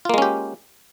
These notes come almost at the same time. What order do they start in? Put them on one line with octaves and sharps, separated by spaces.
F4 A#3 G#3 C#4 G4